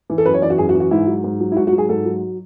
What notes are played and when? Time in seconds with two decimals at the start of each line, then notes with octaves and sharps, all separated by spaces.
0.10 E3
0.18 A4
0.25 F#2 B4
0.34 C#5
0.42 E3 D5
0.50 F#4
0.58 F#2 G#4
0.69 F#4
0.75 E3
0.80 F#4
0.91 G#2 E4
1.07 F#3
1.24 G#2
1.40 F#3
1.52 E4
1.56 G#2 F#4
1.67 F#4
1.73 F#3
1.78 G#4
1.89 G#2 A4
2.05 F#3